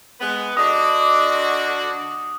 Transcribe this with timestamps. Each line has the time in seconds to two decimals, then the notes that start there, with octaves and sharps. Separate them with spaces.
0.21 G#3 B3 B4
0.57 D3 D4 F#4 D#5 D6 D#6